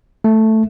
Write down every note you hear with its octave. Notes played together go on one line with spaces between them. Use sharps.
A3